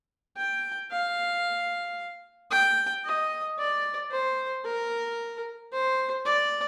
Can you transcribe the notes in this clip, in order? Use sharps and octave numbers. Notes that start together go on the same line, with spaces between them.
G5
F5
G5
D#5
D5
C5
A#4
C5
D5